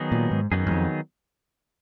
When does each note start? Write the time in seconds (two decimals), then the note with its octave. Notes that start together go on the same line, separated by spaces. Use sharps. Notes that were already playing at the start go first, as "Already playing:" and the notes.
Already playing: D#3 F#3 B3 D#4 G#4
0.12 A#2
0.31 G#2
0.52 F#2 D#3 F#3 B3 D#4 G#4
0.67 F#2
0.71 F2